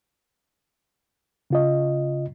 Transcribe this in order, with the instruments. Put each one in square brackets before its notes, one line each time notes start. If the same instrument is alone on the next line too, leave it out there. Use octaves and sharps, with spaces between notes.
[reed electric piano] C#3 F4 D#5